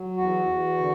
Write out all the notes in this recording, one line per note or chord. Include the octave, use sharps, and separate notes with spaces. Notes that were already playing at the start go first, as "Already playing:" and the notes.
Already playing: F#3
E2 F#4
E2
D3